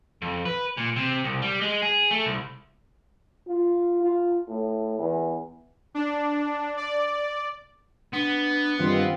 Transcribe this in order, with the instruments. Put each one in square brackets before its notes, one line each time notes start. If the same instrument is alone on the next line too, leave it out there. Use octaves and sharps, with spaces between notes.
[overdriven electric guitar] F2
B4
A#2
C3
C2
G3
G#3
G#4
A3
C2
[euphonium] F4
F4
A2
E2
[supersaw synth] D4
D5
[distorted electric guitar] B3 [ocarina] D4
[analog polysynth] G2 D#3 G3 [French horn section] C4 F4